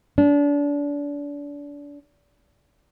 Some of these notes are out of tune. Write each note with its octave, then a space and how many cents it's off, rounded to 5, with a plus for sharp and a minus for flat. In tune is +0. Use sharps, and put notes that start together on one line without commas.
D4 -30